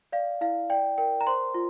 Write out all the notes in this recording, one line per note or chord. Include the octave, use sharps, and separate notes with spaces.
D5 F5
E4 F5
D5 G5
A#4 G5
A#5
C5 C6
F4